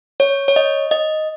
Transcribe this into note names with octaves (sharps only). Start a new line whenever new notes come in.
C#5
C#5
D#5
D#5